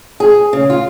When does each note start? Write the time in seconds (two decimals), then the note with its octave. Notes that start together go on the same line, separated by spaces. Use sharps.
0.20 G#4
0.53 C#3
0.70 F4